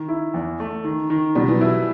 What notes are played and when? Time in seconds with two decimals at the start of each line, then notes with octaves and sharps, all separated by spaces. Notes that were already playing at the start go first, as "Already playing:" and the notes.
Already playing: D#3
0.08 E4
0.34 E2
0.60 A3
0.85 D#3
1.10 D#3
1.35 B2 F3 G3
1.48 E3 F#3
1.61 E3 F#3 E4